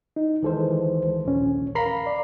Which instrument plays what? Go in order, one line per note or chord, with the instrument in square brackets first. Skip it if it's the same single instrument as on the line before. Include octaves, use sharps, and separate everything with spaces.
[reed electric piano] D#4
[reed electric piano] D2 A4 C5 [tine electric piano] D#3 E3 G#3
[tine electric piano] A#1 [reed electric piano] D#2 C#4
[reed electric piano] A#4 F5 [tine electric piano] A#5 B5 C7
[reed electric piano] D5